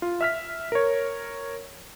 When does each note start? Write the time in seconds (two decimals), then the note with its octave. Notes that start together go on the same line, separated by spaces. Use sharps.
0.02 F4
0.21 E5 F6 B6
0.72 A#4 C#5